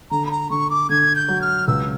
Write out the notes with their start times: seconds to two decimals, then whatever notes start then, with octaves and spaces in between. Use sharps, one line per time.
0.11 D3 A#5
0.26 B5
0.31 A#5
0.50 D3 C#6
0.70 D6
0.89 D3 G#6
1.16 G6
1.28 F#3
1.42 F6
1.68 C#2 E6